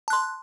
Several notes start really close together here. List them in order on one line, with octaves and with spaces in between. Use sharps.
A5 F#6 C6